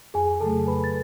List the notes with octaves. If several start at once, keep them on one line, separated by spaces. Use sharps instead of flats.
F2 G#4 G#5
C#3 F#3 A3 A4 A5
F2 B4 B5
A6